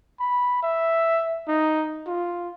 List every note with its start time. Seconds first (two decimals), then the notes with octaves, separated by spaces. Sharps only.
0.20 B5
0.63 E5
1.48 D#4
2.07 F4